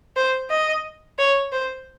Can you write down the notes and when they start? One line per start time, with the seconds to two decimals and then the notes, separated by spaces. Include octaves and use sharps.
0.16 C5
0.50 D#5
1.19 C#5
1.52 C5